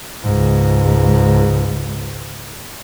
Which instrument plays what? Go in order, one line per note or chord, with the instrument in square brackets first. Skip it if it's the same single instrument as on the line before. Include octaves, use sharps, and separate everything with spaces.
[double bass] C#2 G#2